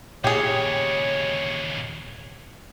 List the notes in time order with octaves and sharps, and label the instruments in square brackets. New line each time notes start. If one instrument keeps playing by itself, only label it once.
[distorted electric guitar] D#2 C#3 [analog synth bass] A#2 [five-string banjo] G4 G#4 [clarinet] C#5